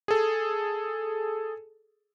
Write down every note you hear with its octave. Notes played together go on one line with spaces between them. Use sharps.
G#4 A4